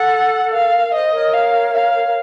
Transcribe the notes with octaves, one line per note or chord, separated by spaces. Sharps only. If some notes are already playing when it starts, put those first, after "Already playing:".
Already playing: A4 F#5
A#4 F5
A4
A#4
C5 D#5
A#4 C#5
F5
F5
A#4